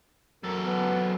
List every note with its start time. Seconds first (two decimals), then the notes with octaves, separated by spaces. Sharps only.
0.43 F#2 A4 A#4
0.65 B3